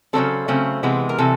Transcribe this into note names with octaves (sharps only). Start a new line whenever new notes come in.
C#3 F#3 A3 C4 A4
C#3 F#3 A3 C4
C3 E3 G#3 B3
A#4
C3 E3 A4